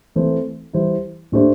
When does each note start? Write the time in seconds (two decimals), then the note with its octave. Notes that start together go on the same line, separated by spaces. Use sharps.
0.16 E3 A3 C4 A4 C5
0.73 E3 G3 E4 C5
1.32 A2 A3 D4 G4 C5